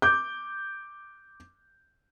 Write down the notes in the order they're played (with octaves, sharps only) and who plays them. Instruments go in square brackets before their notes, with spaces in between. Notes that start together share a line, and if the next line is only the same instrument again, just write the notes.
[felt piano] D6 G6